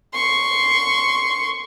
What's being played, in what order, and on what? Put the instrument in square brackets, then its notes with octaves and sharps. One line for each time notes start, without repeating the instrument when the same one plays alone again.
[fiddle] C6 C#6